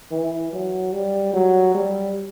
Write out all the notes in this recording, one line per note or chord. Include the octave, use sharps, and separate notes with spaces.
E3
F#3
G3
F#3
G3